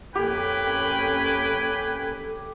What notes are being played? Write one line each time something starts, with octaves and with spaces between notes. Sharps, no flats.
F2 A#3 C#4 G4 A4 B4 G5 G#5